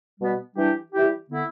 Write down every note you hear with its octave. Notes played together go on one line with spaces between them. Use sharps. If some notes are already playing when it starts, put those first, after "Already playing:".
B2 G3 B3
E3 G3 D4 G4
E3 G3 E4 G4
D3 B3 E4